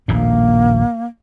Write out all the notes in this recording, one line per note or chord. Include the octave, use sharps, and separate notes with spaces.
D#1 A#1 A2 A#3